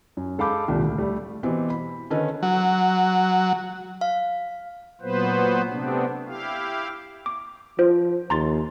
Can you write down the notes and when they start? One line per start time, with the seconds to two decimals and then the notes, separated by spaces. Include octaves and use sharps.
0.17 F#2
0.38 G#3 A4 F5 B5 D6 G6
0.68 C2 A#2 D#3
0.84 D2
0.98 G3 A3
1.43 B2 E3 C4 G4
1.70 B5
2.10 D3 D#3 C#4 D#4 B4
2.42 F#3
4.01 F5
5.01 A#2 F#3 B3 B4 C5
5.69 C3 A3 B3 C4 D4
6.27 E4 G4 F5
7.26 D6
7.79 F3 F4 C5
8.30 D#2 A#5 C6 A6